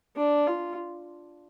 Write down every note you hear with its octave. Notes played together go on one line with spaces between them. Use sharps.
D4
F4